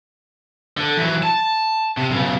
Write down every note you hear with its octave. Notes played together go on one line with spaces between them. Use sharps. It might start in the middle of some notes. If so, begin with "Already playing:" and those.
D3
E3 F#3
A5
C3
B1 C#3